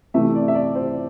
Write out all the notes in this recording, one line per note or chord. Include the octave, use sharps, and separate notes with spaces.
C3 E3 A3 E5
D5
E5
D5
C5